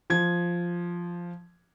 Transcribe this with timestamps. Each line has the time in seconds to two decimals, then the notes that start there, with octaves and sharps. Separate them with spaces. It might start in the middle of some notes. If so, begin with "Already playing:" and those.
0.10 F3 G#6